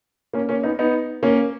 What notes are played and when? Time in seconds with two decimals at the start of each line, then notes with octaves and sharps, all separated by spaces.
0.33 A#3 C#4
0.49 A#3 C#4
0.63 B3 D#4
0.79 B3 D#4
1.23 A#3 C#4